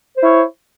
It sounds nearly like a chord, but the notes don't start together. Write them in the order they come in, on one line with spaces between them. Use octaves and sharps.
C5 E4 C#5